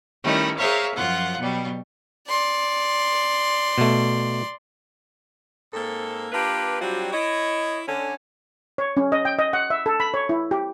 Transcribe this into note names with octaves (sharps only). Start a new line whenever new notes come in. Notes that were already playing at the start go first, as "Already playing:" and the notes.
D#3 G3 A3 C#4 D#4 E4
G#4 A#4 C5 C#5 E5 F5
F#2 F3 F4 F#5
B2 F#3 G3
D5 C6
B2 A3
G#2 A#3 C4 A4
A#3 D4 F4 G4 B4
F#3 G3 C4 D4 F4 F#4
E4 C#5 D#5
D3 C#4
C#5
C#4
D#5
G5
D#5
F#5
E5
A4
B5
C#5
E4
G4